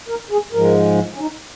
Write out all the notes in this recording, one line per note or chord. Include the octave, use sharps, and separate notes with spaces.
A#4
G#4
G#2 F3 G#3 A#4
C#4
D#4